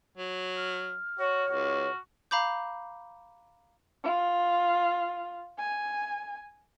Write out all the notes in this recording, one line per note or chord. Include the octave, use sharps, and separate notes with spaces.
F#3
F6
F#4 C#5
C#2 F#4
F5 A#5 B5 D6 G6
F4
G#5